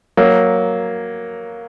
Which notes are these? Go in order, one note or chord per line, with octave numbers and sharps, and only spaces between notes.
F#3 A#3